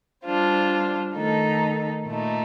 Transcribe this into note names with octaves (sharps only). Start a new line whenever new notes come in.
G3 D4 F4 C5
D#3 A3 D#4 A4
A#2 A3 D#4